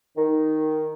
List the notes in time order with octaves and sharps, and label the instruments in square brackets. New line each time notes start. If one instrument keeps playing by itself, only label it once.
[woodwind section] D#3